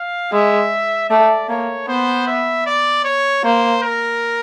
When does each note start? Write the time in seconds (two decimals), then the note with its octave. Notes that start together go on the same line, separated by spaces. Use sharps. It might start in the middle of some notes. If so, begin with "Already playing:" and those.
Already playing: F5
0.32 G#3 E5
1.10 A3 D5
1.49 A#3 C#5
1.88 B3 C5
2.27 E5
2.66 D5
3.04 C#5
3.44 A#3 C5
3.82 A#4